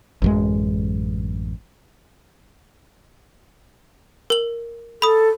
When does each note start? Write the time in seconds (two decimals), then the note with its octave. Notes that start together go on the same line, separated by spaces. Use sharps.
0.22 A1 F#2 G#3
4.30 A#4 F#7
5.02 A4 B5 D#6